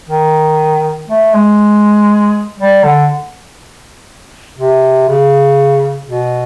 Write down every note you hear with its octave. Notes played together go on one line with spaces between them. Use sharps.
D#3
A3
G#3
G3
D3
C3
C#3
B2